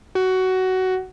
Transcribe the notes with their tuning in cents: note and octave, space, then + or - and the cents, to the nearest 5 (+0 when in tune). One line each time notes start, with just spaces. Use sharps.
F#4 +15